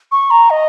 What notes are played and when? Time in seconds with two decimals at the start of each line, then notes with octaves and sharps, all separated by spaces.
0.12 C#6
0.30 A#5
0.50 D#5